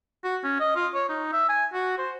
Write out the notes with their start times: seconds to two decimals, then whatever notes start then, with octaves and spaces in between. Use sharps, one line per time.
0.24 F#4
0.44 C#4
0.60 D#5
0.76 F4
0.94 C#5
1.09 D#4
1.33 E5
1.49 G#5
1.74 F#4
1.98 C5